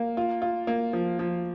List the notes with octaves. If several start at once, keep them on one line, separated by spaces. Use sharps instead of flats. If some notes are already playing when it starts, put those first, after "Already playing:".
Already playing: A#3
F4
F4
A#3
F3
F3